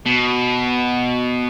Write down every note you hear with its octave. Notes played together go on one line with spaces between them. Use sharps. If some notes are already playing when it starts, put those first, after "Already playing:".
B2